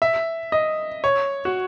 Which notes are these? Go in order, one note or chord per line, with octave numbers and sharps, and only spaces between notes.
E5
D#5
C#5
F#4